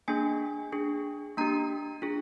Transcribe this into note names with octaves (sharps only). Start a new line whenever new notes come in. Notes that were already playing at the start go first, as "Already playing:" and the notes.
A#3 D4 G#4 G#5
D4 G#4
A#3 D4 G4 A#5
D4 F4 G#4